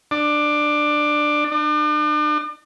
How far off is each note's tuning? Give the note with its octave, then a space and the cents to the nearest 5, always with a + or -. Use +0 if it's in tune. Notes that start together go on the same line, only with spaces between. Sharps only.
D4 +15
D4 +40